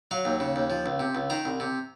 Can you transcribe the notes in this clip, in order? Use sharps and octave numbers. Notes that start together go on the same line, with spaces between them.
F#3 F5
D#2
C#3
D#2
F3
C#2
C3
C#2
D#3 A#5
C2
C3